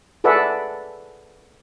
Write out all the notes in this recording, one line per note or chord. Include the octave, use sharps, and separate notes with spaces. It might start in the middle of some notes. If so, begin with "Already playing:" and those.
G#4 A4 B4 D5 E5 F#5